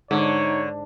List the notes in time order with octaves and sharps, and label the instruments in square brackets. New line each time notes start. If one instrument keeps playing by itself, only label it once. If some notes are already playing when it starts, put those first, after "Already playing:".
[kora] G#2 [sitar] D3 [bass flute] D#4 [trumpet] C#5